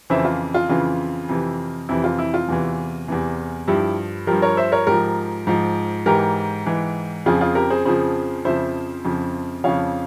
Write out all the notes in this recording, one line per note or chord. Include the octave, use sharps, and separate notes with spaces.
F2 C#3 E3 C5 E5
F4
F4
F2 C#3 E3 F4
F2 C3 E3
F2 C3 E3 E4
F4
E4
F4
E2 C3 E3
E2 C3 E3
G2 F3 E4 G4
G2 F3 G4 A#4
A#4 C#5
C5 E5
A#4 C#5
G#2 F3 G4 A#4
G#2 F3
G#2 E3 G4 A#4
G#2 E3
F2 C#3 F3 F4 G#4
F4 G#4
G4 A#4
G#4 C5
F2 C#3 F3 G#4 C5
F2 C#3 F3 C5 E5
F2 C#3 F3
F2 C#3 F3 C#5 F5